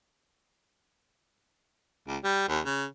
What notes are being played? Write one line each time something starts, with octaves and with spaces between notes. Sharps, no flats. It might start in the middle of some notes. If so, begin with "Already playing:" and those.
C#2
G3
D#2
C#3